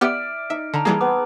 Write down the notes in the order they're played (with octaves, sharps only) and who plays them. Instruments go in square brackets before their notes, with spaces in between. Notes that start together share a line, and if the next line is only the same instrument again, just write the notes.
[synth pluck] B3 G4 [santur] D5 E5 [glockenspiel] F6 D7
[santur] D#4 [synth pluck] E5
[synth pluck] D3 [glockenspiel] A5 A#5
[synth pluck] E3 G3 A#3 [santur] G#4
[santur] B3 [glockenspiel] D6